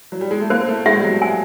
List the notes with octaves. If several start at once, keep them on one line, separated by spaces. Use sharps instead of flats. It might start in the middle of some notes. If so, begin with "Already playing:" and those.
F#3
G3
G#3
A3
A#3 C5
A3
G#3 E5
G3
F#3
G#5